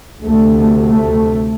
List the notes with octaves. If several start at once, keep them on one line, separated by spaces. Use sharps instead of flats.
D2 C3 A3
A3